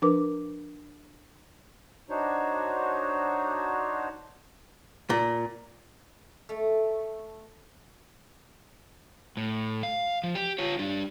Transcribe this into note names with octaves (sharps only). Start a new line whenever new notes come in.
F3 D4 A#4 B4 D6
D4 D#4 F#4 C5 C#5
A#2
A3
A2
F5
F3
G4
F4 C#5
G3 D4